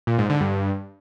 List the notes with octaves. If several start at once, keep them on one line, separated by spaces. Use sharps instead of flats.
A#2
G#2
D3
G2